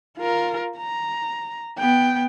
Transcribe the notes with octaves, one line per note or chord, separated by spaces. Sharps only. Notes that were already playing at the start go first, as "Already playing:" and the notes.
F4 A#4
A#5
B3 G5